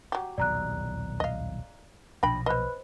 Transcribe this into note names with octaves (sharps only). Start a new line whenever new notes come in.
F#3 G4
D#1 B1 E2 D5 A#5 F#6
D#5 F5
B1 A#2 F3 D4 G5 B5 A#6
B4 C5 D#5 B5 F#6